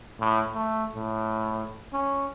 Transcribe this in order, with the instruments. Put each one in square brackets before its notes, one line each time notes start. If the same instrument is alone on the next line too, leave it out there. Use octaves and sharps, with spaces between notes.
[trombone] A2
A3
A2
C#4